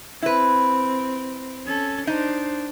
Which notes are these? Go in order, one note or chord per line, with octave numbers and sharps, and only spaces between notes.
C4 E4 B4
C#4 A4
D4 D#4 C5